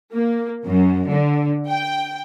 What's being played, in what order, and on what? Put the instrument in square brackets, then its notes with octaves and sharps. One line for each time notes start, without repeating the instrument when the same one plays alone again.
[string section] A#3
F#2
D3
G5